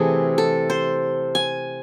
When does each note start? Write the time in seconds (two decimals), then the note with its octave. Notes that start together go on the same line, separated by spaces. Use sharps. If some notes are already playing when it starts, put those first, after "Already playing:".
Already playing: C3 E3 A3 G#4
0.38 A4
0.70 C5
1.35 G#5